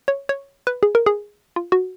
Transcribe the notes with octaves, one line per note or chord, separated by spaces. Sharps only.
C#5
C#5
B4
G#4
A#4
G#4
F4
F#4